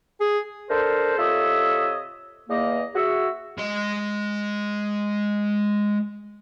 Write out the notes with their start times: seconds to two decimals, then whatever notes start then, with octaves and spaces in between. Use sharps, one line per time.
0.20 G#4
0.70 D4 A4 A#4 C5
1.17 C3 F4 A4 C#5 D#5 E5
2.49 E2 A#3 D#5
2.95 F#4 G#4 E5
3.58 G#3 D#5